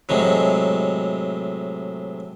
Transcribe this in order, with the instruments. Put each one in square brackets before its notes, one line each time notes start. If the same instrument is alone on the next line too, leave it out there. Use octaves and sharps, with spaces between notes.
[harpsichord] A2 C3 F#3 G#3